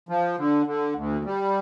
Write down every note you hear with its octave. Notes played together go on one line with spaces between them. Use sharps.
F3
D3
D3
D2
G3